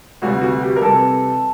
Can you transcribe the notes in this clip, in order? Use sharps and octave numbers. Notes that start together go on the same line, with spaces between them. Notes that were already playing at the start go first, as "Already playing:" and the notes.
D2 C3 E3 G3 F#4
F#4
G4
A#4
C3 E3 G3 A4